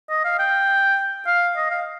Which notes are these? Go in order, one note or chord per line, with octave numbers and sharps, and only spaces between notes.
D#5
F5
G5
F5
D#5
F5